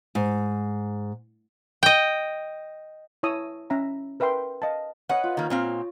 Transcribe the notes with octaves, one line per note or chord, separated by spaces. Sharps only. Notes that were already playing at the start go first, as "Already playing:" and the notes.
G#2
D#5 G5
E4 C#5 A5 D#6 E6
C#4 E5 A#5
A#4 B4 E5 G5 C6
D#5 F5 A5
B4 C#5 D#5 F#5
F4
D#3 A#3
A#2 C4 F5